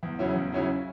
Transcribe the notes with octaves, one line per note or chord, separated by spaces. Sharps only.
E2
C#3 F#3 C#4 E4
E2
C#3 F#3 C#4 E4